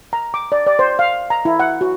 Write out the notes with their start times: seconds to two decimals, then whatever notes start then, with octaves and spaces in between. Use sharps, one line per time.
0.13 A#5
0.34 D6
0.52 D5
0.66 D5
0.79 C5
0.99 F5
1.30 A#5
1.45 E4
1.60 F#5
1.81 F#4